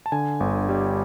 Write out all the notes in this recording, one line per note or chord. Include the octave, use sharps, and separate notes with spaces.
A5
D3 G#5
G1
G3